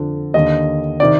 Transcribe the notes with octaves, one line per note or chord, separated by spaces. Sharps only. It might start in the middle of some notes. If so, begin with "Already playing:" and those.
Already playing: F2 D3
D#2 D3 D#5
C3 D#3 D5